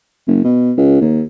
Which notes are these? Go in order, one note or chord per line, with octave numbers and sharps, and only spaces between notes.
F#1
B2
C#2
D#2